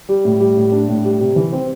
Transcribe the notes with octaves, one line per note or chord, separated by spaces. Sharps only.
G3
A2
G3
A2
D4
A2
G3
C3
E3
C4